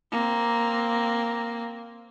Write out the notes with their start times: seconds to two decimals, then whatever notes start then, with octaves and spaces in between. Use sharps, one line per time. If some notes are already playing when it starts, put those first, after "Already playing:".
0.12 A#3 C4